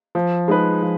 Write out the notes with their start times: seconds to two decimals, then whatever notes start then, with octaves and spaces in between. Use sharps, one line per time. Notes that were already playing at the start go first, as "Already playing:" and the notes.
0.15 F3
0.48 G#3 D#4 G#4 B4
0.82 F3